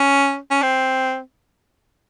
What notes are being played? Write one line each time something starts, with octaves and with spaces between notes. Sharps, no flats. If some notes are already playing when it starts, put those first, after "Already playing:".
Already playing: C#4
C#4
C4